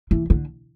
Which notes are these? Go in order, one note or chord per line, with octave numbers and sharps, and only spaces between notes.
E3
D3